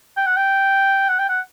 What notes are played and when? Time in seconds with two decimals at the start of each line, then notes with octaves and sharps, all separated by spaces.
0.17 G5
0.26 F#5
0.36 G5
1.09 F#5
1.19 G5
1.29 F#5